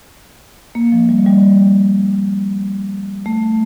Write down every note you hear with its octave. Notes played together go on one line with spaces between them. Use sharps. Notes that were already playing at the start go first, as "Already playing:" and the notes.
A#3
F3
G3
G3
A3